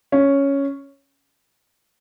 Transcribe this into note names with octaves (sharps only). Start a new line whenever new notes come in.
C#4